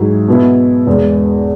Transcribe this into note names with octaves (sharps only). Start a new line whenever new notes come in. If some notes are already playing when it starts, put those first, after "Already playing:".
Already playing: G#2 F#3 E4 G#4
B2 B3 E4
E1 E2 E3 G#3